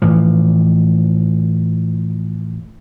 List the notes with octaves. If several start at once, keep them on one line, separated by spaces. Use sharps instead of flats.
A2 E3 F3